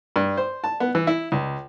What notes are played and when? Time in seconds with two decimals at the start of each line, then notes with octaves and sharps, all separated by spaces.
0.16 G2
0.37 C5
0.64 A5
0.80 B3
0.95 E3
1.07 E4
1.32 C#2